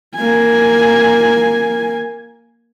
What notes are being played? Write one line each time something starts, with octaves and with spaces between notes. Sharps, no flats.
A#3 G#5